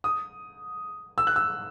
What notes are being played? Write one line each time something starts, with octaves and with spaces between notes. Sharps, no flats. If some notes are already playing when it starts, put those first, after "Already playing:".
D#6
E6
F#6
E6